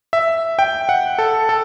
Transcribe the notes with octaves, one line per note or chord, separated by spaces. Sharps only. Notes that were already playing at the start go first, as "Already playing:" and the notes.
E5
G5
F#5
A4
A4